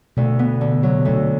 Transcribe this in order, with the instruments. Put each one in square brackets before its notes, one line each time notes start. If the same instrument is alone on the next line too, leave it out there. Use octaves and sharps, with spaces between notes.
[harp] D2 [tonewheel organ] B2
[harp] B3
D3
F#3
D2